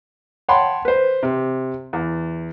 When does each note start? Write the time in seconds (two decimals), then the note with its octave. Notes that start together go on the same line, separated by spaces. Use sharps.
0.49 C#5 F#5 G5 A5 B5 C6
0.85 B4 C5
1.23 C3
1.93 E2